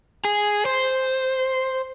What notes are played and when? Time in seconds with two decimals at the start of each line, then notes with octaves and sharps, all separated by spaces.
0.25 G#4
0.66 C5